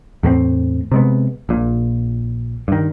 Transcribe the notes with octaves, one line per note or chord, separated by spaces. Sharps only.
E2 A2 A#3 C4
C3 G#3 B3
A#1 A#2
G2 D#3